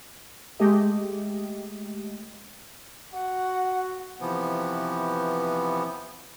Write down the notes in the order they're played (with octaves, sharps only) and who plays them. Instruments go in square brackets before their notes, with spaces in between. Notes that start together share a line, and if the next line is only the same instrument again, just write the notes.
[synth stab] G#3 A3 G4 D#5
[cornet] F#4 [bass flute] F#5
[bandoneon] C3 E3 F3 B3